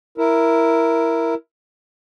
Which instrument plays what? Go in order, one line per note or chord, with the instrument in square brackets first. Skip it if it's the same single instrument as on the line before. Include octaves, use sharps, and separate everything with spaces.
[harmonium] E4 A#4